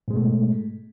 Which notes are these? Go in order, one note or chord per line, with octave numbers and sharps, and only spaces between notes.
G#2 B2 G#3 A3